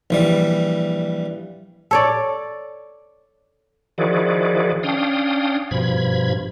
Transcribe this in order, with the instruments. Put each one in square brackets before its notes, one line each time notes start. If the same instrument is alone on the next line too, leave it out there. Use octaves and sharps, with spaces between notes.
[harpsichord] A#1 E3 G3
[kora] A4 C#5 D5
[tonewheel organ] D#3 F3 E4 F#4 G#4 D5
C#4 D4 F5 G5 D#6
G2 B2 F3 B5 G#6